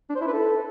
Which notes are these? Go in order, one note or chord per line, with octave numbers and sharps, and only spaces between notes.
D4
C5
E4
B4
A4